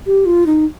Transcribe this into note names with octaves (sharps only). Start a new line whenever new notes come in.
G4
F4
D#4